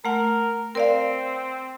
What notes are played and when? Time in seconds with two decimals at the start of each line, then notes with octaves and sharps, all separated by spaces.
0.05 A3 A#4 F#5
0.75 C4 A#4 D5 F5